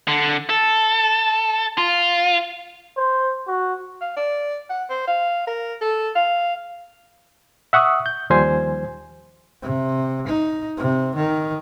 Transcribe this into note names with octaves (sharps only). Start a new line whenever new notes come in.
D3
A4
F4
C5
F#4
F5
D5
F#5
C5
F5
A#4
A4
F5
E5 F#5 C#6 D#6 F#6
G6
D#2 F3 G3 C5 G#5
C3
D#4
C3
D#3